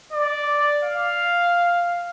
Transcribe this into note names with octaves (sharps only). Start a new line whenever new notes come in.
D5
F5